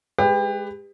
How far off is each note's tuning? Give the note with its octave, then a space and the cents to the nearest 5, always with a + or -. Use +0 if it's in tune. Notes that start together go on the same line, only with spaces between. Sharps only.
G#3 +0 G4 +30 B4 +15